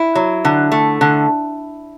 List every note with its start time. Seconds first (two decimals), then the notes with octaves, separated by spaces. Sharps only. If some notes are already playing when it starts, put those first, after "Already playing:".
Already playing: E4
0.15 F#3
0.45 D3
0.72 A3
1.01 D3